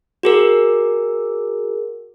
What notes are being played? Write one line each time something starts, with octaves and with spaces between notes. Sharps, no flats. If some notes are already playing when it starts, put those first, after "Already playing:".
F#4 G#4 A#4